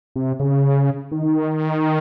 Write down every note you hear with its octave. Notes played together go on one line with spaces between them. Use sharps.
C3
C#3
D#3